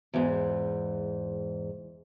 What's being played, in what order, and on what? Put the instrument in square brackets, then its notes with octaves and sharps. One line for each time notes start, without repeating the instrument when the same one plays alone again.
[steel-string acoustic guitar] E2 G#2